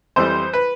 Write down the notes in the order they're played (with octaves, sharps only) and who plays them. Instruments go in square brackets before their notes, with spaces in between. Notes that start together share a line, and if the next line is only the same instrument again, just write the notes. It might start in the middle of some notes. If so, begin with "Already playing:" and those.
[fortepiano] F2 E3 G3 C5
B4